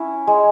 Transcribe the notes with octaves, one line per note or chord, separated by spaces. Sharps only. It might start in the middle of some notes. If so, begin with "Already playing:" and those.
Already playing: C#4 E4
G#3